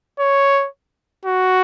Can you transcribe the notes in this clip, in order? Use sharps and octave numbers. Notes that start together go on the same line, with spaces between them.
C#5
F#4